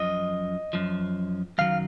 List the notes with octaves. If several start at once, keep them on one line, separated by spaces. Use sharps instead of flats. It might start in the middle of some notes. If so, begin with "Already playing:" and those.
Already playing: F#2 F3 D#5
F#2 F3
F#2 D#3 F#3 F5